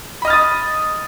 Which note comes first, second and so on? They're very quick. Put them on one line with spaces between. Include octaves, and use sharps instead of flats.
B5 D#5 F6 A6 D#6